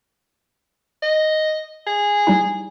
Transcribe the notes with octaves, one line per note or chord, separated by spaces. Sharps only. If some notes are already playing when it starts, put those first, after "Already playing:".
D#5
G#4
G3 D#4 E4